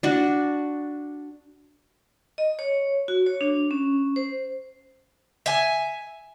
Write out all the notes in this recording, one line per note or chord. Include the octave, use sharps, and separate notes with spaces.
D4 F#4
D#5
C#5
F#4
C#5
D4
C#4
C5
E5 G#5